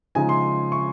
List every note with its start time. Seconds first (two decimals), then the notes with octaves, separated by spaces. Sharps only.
0.15 C#3 F3 G#3 D#4 G#5
0.29 C6
0.72 C#6